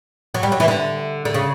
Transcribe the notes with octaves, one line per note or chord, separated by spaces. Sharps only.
F#3
G3
F#3
E3
D3
D3
C#3